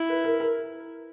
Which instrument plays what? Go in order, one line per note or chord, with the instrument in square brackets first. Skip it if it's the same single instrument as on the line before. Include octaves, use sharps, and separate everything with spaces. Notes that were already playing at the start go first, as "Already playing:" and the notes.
Already playing: [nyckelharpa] E4
[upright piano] B4
A#4
A#4